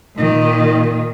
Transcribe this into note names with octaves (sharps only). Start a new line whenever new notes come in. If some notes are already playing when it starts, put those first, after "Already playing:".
A#2 D#3